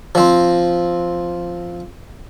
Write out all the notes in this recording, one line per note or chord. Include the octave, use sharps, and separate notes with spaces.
F3 C4